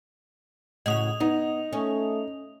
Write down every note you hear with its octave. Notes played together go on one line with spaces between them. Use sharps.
A2 C#3 F#4 D#5 D#6 F7
B3 D#4
A3 C#4